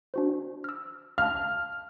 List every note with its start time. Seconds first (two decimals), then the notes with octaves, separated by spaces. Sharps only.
0.14 D4 F#4 C5
0.64 E6 F6
1.18 F5 A5 F6